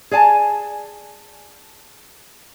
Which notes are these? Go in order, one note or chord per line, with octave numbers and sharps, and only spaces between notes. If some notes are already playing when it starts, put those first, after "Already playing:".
G#4 D5 G#5 A5